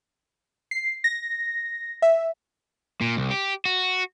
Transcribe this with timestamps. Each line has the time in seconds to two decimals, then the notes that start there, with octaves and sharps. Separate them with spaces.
0.71 C7
1.04 A#6
2.02 E5
3.01 A#2
3.17 C2
3.31 G4
3.65 F#4